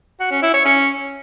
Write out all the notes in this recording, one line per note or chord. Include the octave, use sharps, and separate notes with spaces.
F#4
C#4
E4
C#5
C#4